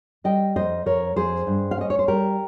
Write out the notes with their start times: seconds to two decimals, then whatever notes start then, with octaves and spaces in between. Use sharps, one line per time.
0.24 G3 D#5 G5
0.56 F2 C5 D#5
0.86 F2 A#4 C#5
1.16 F2 G#4 C5
1.47 G2
1.71 F5
1.78 C#4 D#5
1.90 C#5
1.99 C5
2.08 G3 G4 A#4